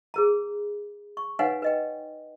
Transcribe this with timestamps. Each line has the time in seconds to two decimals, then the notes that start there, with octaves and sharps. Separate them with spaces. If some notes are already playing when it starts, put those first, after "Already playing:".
0.14 G#4 A#4 A#5
1.17 C#6
1.39 D#4 B4 C#5 F5 F#5 G#5
1.62 B4 D#5 G5